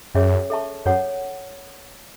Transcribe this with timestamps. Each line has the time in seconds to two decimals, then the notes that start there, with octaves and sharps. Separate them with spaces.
0.15 F#2 C#4 G#4 C#5 E5
0.50 A4 E5 A5 C#6
0.86 F#2 A4 C#5 F#5